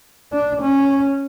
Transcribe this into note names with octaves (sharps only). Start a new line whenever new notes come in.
D4
C#4